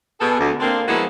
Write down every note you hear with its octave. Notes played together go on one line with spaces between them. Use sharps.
B2 G#4 A4
D2
A#3 C4 D4
F3 G#3 A#3 B3 E4 F#4